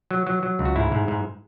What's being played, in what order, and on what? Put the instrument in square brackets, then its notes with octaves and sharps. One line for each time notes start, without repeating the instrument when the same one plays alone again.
[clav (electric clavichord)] F#3
F#3
F#3
C#2
F#4
G#2 E4
G#2
G#2